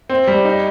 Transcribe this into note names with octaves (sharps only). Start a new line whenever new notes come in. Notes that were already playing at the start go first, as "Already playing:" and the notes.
C4
G3
D#4